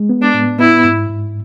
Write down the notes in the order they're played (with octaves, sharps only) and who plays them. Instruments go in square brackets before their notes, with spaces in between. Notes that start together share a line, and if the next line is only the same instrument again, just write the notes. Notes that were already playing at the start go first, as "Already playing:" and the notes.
Already playing: [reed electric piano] G#3
B3
[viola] D4
[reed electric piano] A2
[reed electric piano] B3 [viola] E4
[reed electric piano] G#2
G#2